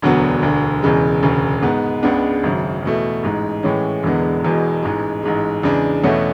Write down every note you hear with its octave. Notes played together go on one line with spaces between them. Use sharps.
E1 D2 D3 F#3 B3
E1 D2 D3
E1 E2 C#3 G#3
E1 D2 C#3
G#2 G#3 B3
C#2 C#3 G#3 B3 D4
G#1 F#2 C#3
E2 B2 A3
A1 G#2 G#3
A2 E3 G#3 C#4
E1 E2 D3 G#3 B3
E1 E2 B2 G#3
A1 G#2 G#3
A1 G#2 G#3
E2 C#3 G#3 D4
E2 B2 A3 C#4 F#4